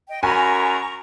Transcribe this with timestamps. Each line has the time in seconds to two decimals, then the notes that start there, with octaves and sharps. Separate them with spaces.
0.09 D#5 G5
0.23 F#2 G#5 A#5 B5 C#6